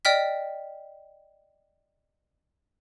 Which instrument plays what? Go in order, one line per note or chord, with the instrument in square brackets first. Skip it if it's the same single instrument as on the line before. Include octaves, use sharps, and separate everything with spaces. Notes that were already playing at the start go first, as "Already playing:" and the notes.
[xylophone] D5 D#5 G5 F6 B6